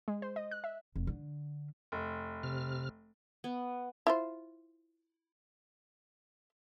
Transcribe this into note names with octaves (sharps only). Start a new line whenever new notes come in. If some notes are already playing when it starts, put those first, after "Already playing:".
G#3
C5
D#5
F#6
E5
F1
D3
F1
C3 F6
B3
E4 F4 C5